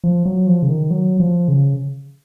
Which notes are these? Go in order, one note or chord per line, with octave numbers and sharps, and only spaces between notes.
F3
F#3
F3
C#3
D#3
F#3
F3
C#3